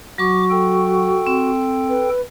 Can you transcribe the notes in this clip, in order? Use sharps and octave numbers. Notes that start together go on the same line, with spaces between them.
F#3 F#4 C#6 D6
A4 G5
C4
B4